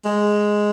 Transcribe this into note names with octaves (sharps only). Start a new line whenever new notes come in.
G#3